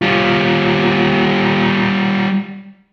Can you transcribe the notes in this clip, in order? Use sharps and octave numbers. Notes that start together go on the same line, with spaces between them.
G3 F4